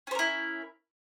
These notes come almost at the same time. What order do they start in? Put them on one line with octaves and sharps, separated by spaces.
C#4 C5 A#4 E4